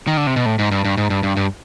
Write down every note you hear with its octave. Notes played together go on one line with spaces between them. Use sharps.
D#3
D3
C3
B2
A2
G#2
G2
G2
G#2
G2
G2
G2